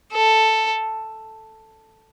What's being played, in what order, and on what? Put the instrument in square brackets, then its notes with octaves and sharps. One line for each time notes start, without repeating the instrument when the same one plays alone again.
[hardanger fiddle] A4